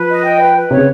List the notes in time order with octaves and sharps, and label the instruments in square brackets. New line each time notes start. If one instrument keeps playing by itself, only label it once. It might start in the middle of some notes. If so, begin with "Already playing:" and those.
Already playing: [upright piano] F3 [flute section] B4
[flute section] D#5
G5
B4
B4
[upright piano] C3 [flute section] C#5
[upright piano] C#3